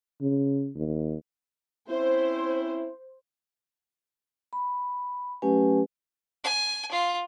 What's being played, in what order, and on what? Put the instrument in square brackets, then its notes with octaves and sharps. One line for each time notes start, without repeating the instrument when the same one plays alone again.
[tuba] C#3
D#2
[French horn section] C4 C#4 E4 [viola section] C5
[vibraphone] B5
F#3 A3 C#4 G4 B4 G#5
[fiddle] G#5
F4